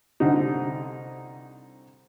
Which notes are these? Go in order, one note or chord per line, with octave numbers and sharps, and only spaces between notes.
C2 D3 D#4